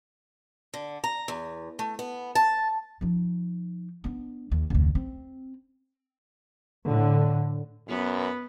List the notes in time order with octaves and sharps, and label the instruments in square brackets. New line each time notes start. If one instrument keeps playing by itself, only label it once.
[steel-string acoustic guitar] D3
A#5
E2
A3
B3
A5
[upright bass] F3 D#4
B3 D4
D#2
F1 D2
C4
[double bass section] A2 D3
[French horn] F#2 [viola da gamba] B3 B4